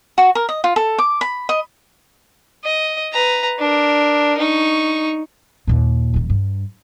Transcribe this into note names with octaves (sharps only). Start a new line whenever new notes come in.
F#4
A#4
D#5
F4
A4
D6
B5
D#5
D#5
B4 A#5
D4 A#4
D#4 C#6
D#2 A#2
D#1 D#3
G2